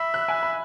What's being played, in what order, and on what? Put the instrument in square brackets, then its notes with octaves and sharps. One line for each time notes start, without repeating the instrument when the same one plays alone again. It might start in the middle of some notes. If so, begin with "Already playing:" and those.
Already playing: [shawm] E5 [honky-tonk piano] B5
[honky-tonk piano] F#6
G#5
B5